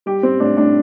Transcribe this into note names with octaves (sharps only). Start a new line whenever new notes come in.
G3 G4
G3 C4
A2 D4
A2 D4